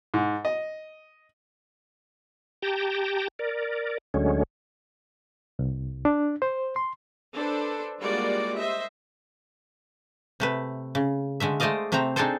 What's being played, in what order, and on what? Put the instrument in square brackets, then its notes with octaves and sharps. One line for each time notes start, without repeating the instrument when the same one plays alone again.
[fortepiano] G#2
D#5
[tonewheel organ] G4 G5 A5 A#5
A#4 D5
D2 D3 F#3 G#3 C#4
[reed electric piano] C2
D4
C5
C6
[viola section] D4 A4 B4 C5
G3 G#3 A#3 F4 F#4 D5
C5 D#5 E5
[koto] C3 A3 B4
C#3
D3 G#3 A3 E5
G#3 A3 C5 D5 D#5 F5
C3 A3 C4 C5 A#5
C4 D4 D#4 G#4 A4 C5